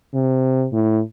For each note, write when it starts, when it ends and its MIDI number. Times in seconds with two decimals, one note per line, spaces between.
0.14 0.66 48
0.72 1.00 45